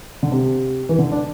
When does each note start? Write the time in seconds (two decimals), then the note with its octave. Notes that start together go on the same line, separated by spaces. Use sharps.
0.23 D3
0.32 C3
0.89 E3
0.99 D3
1.12 D4